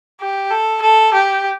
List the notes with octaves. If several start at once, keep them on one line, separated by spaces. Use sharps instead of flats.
G4
A4
A4
G4